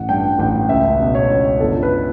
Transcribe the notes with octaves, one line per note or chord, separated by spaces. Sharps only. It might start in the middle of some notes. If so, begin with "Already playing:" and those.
Already playing: A1 F#5
G2 G5
A1 G5
C#2 E5
B2
C#5
C#2
G1 A4
B4